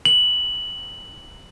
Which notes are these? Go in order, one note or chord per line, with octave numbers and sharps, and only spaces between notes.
F#7